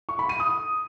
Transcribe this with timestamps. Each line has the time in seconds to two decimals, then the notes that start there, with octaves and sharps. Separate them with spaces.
0.09 C#6
0.19 B5
0.29 D#7
0.40 D#6